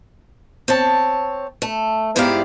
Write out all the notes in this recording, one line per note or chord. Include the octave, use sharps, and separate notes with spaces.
C4 C#5 A5
A3
G#2 B3 E4 G4 D5 F5